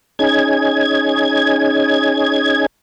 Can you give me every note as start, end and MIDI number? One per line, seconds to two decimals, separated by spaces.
0.19 2.66 61
0.19 2.66 63
0.19 2.66 68
0.19 2.66 92